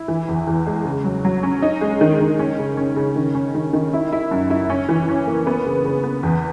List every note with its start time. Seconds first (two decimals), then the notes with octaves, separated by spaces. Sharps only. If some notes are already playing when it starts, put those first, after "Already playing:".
Already playing: E4
0.08 E3
0.29 E2
0.47 E2
0.67 G#3
0.85 C#3
1.04 F#3
1.25 F#3
1.43 C#4
1.62 D#4
1.81 G#3
2.01 D#3
2.20 D#3
2.39 C#4
2.59 C#3
2.77 C#4
2.96 C#3
3.16 D#3
3.35 C#4
3.55 D#3
3.73 D#3
3.93 E4
4.12 E4
4.31 F#2
4.50 E4
4.70 C#4
4.89 E3
5.09 C#4
5.27 A#3
5.47 B3
5.66 C#3
5.85 C#3
6.04 B3
6.23 E2